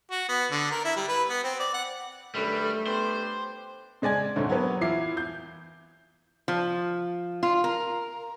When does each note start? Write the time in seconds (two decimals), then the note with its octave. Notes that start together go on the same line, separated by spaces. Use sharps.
0.11 F#4
0.29 B3
0.51 D3
0.72 A#4
0.85 E4
0.96 G3
1.08 B4
1.29 B3
1.44 C4
1.60 D5
1.74 F#5
2.35 F#2 D3 G3 A3 B4
2.87 B3 D4 G4 C5
4.02 C#3 G#3 D5 G#5 G#6
4.36 D2 G#2 D3 A3 C4 C#4
4.49 F#3 G3 A#3 B3 B4
4.81 E3 E4 F4 D6 C7
5.17 G6
6.48 F3
7.43 F4
7.64 A#4